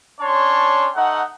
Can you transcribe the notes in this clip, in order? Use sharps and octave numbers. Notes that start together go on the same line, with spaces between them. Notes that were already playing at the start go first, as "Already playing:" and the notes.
C#4 D4 C#5 A5 C6
A3 D#4 F#5